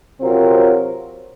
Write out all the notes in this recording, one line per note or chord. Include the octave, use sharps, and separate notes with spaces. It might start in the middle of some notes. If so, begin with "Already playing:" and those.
C3 F#3 C4 F4 A#4